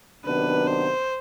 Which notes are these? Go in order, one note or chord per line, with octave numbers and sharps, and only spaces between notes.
C3 D#3 F#3 B3 D4 B4
C5